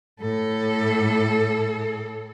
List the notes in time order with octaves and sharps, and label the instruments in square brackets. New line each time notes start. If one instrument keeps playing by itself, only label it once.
[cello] A2 A4